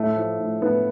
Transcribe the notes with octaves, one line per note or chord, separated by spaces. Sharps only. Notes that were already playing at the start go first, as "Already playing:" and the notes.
Already playing: A2 A3
F3
A2
A2 B3